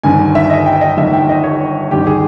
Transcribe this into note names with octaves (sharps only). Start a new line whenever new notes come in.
G1 G2 D#3 G#5
E5
D#5
G5
D#5
G1 G2 D#3 E5
G5
D#5
C#5
G1 G2 D#3 G4
G#4